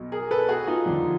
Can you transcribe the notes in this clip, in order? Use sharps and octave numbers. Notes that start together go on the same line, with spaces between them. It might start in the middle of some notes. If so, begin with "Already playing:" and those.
Already playing: B1 B2
G#4 A#4
A4 B4
F#4 G#4
D#4 F4
D#2 D3 F3